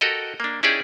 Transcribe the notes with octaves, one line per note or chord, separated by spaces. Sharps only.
F#4 G4 A4 A#4 D#5
A#3 D4
C#4 D#4 E4 G4 G#4 D5